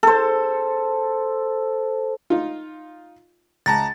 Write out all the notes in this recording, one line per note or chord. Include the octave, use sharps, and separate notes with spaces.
A4 C5
D#4 F4
C#2 A5 A#5 A6